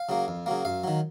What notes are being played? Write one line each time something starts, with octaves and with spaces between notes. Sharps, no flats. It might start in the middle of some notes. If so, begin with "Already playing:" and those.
Already playing: F5
C#3 F#3 A#3
F2
C#3 F#3 A#3
F#2 F5
D#3 F#3